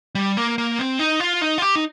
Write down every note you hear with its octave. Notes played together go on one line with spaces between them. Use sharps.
G3
A#3
A#3
C4
D#4
F4
D#4
F4
G4
D#4